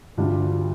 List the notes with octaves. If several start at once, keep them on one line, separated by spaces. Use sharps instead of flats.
D2 G2 D3 G3 D4 F4